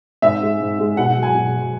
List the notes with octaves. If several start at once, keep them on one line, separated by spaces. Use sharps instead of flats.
G#2 E5
G#3
G#2
G#3
B2 F#5
F#3
G#5
B2
F#3